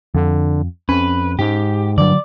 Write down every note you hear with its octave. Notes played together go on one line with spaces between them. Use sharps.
F2 D3
F2 C#4 B4
G#2 G4
G2 D3 F#3 D5